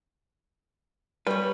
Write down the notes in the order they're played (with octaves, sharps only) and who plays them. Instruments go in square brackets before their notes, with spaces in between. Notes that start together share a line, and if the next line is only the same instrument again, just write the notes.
[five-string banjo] G3 [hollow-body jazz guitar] B4 C#5